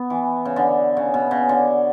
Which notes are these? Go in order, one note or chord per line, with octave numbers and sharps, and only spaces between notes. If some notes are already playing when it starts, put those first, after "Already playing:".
Already playing: B3
E3
C#3
D3
C#3
B2
C#3
D3